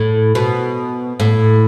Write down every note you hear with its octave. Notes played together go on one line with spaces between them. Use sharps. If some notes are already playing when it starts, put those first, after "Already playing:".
Already playing: A2
B2
A2